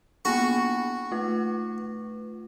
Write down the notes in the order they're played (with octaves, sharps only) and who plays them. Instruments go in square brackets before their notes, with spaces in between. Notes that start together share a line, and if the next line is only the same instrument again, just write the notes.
[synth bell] A#3 B3 D4 [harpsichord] F#4 C#6
[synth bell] A3 F4 B4